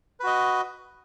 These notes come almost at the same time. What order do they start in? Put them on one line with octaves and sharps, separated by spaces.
B4 F#4 D#5